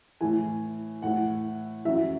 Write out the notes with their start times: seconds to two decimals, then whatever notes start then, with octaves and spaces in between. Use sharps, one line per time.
0.21 A2 E3 G#5
1.02 A2 E3 F#5
1.85 F#2 E3 E5